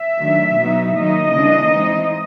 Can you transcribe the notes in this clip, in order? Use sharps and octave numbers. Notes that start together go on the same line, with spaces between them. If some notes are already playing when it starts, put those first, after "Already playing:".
Already playing: E5
D#3 F#3 A3 D4
B2 F#3 B3 D#4
D#3 F#3 A#3 D#4 D#5
C#3 E3 G3 A#3 D4
E3 G#3 C4 D#4